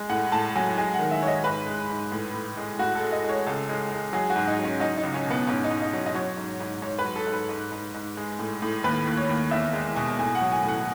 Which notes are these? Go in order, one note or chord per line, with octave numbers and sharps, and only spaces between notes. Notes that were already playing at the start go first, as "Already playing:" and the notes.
Already playing: G#3
A2 F#5
A2 A5
F#3 G#5
G#3 G#5
F#5
D#3
E5
G#3 C#5
D#5
G#2 B4
G#3
G#2
A2
A2
G#3
A2 F#4
A4
G#3
D#5
G#3 C#5
C#2 A4
G#3
G#3
F#3 G#4
F#4
G#2
D#4
F#3
C#4
F#3 D#4
D#4
C#2
C#4
B2 B3
G#2 C#4
D#4
G#2
D#4
F#3
D#5
F#3 C#5
G#2
G#2
G#2 C#5
B4
F#3
A4
G#2
B4
G#2
G#2
G#2
G#3
A2
A2
D#2 B4
D#2
C#5
D#2
E2 E5
G#3
B2 G#5
A2 G#5
F#5
F#3
G#5
A2 F#5